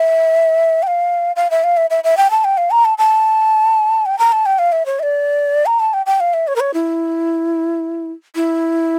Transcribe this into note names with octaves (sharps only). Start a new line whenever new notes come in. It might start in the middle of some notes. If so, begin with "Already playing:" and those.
Already playing: E5
G5
F5
F5
E5
F5
E5
E5
E5
G5
A5
G5
F5
A#5
A5
A5
G5
A#5
A5
G5
F5
E5
C#5
E5
D5
A#5
A5
G5
G5
F5
E5
C#5
A#4
C#5
E4
E4